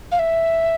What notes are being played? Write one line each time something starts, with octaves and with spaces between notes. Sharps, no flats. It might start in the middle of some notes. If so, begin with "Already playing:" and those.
F5
E5